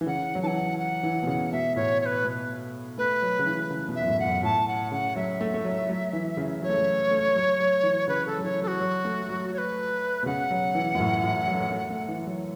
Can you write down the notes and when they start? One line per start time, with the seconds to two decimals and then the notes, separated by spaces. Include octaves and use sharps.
0.01 E3
0.06 C#3 F#5
0.35 F#3
0.43 E3 F#5 A5
0.79 F#5
1.03 E3
1.23 B2
1.27 C#3
1.52 B2 E5
1.76 A2 C#5
2.01 C#5
2.06 B4
2.25 B2
2.98 A3 B4
3.22 F#3
3.39 C#3
3.46 E3
3.70 C#3
3.88 B2
3.95 E5
4.01 F#2
4.07 A2
4.20 F#5
4.25 F#2
4.43 A2 A5
4.68 F#5
4.91 C#3 F#5
5.16 F#3 E5
5.41 A3
5.54 A3
5.65 F#3
5.89 F#3
6.13 E3
6.37 C#3
6.62 F#3 C#5
6.69 A3
6.77 F#3
7.11 A3
7.35 F#3
7.60 F#3
7.83 E3
8.08 C#3 B4
8.26 C#3 A4
8.38 F#3
8.44 E3 C#5
8.62 F#3 A4
8.67 F#4
8.80 F#3
9.05 A3
9.29 F#3
9.53 C#5
9.58 B4
10.23 B2
10.26 C#3 F#5
10.51 F#3
10.75 E3
10.95 F#2
11.00 A2
11.24 A2
11.48 F#3
11.54 A3
11.61 F#3
11.72 A3
11.91 A3
12.08 E3
12.27 F#3